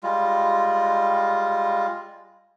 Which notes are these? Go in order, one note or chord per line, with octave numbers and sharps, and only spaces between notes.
G3 G#3 F4